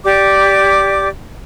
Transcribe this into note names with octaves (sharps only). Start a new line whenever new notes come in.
G4 D5 D6